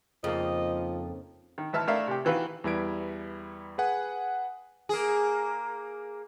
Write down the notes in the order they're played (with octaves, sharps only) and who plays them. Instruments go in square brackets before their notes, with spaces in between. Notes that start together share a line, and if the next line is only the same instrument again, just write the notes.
[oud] F2 [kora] C#3 A#3 D#4 [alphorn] F3 [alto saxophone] D#5
[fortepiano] D#3
G#1 E3 E5 A5 F6
A3 D4 E4 A#4 E5 F5
C3 G4
D#3 E3 F#4 B4 F5
[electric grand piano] E2 G3 E4 B4 G#6 D7
G#4 B4 F#5 G#5
[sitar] A#3 G#4